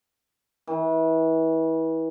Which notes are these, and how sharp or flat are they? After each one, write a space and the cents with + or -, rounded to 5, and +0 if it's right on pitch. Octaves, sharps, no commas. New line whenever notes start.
E3 -30